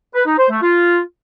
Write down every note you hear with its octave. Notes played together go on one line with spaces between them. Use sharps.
B4
D#4
C5
A3
F4